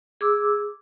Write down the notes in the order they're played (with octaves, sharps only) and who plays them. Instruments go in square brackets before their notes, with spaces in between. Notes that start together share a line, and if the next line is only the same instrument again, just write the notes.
[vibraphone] G#4 D6 E6